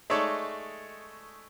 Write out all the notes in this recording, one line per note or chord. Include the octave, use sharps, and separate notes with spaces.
G#3 A3 D#4 A4 C#5 D5